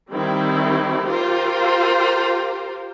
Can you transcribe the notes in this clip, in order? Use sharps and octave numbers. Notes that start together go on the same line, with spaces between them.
D#3 G3 C4 E4
F4 G4 A#4 C5